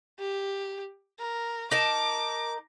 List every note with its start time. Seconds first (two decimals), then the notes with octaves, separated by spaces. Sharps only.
0.19 G4
1.19 A#4
1.71 D#4 A#4 A5 D6